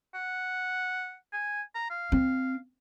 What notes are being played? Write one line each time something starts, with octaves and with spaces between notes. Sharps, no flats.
F#5
G#5
A#5
F5
C4